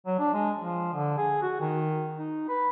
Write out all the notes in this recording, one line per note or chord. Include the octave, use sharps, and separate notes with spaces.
F#3
D4
G#3
F3
D3
G#4
F#4
D#3
D#4
B4